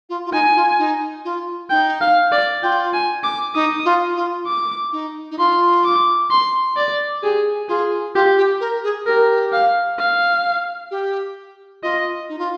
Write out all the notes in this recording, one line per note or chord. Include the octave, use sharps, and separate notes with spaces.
F4
F4
D#4 G#5
F4
D#4
F4
D#4 G5
F5
D5
F4 G5
G#5
D6
D#4 D#6
F4
F4
D6
D#4
D#4
F4 C6
D6
C6
D5
G4 G#4
F4 G#4
F4 G4
G4
A#4
G#4
G4 A#4
F5
F5
G4
F4 D#5
D#4
F4